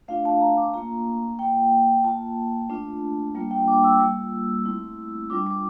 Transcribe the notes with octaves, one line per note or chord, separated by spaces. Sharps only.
A3 D4 F4 F5
A5
A#5
D6
A#3 F4 A#5
A#3 F4 G5
A#3 F4 A5
A3 D4 F4
G3 A#3 D4 F4
G5
D6
E6
G3 A#3 F4 E6
A3 C4 E4
G3 D4 F4 D6
D6